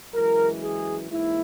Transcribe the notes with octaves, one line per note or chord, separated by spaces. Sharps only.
F#2 E3 G#3 A#4
G#4
G#2 E3 A#3 E4